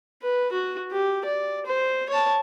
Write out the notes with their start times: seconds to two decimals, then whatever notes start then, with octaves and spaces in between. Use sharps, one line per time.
0.23 B4
0.52 F#4
0.91 G4
1.25 D5
1.66 C5
2.09 C#5 A5